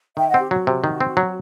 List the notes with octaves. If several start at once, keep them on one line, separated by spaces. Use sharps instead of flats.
D#3 E5 G5
D#5 F#5
C4
G4
F#3 F#4
C3
D#3
C4
F#3